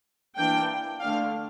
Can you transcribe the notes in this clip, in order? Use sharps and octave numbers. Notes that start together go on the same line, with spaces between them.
E3 A#3 D4 G5
D3 A3 D4 F5